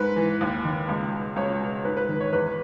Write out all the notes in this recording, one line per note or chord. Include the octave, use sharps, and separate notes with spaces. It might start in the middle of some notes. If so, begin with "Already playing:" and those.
Already playing: G#2 B4
E3
D#2
D#3
C#2
B2
C#2 C#5
B2
G#2 B4
B4
D#3
C#5
E2 B4